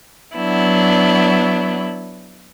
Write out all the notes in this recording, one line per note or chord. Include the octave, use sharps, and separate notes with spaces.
F#3 B3 D4 E4